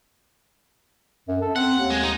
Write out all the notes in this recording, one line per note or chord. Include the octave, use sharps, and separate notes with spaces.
F#2
A4
C4 F#5
D#2
G#3
D#4